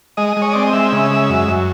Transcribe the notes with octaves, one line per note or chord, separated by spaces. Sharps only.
G#3 D#5
G#3
C#5
C4 D5
D#5
G#3 E5
C#3
G#3
F#2
F#2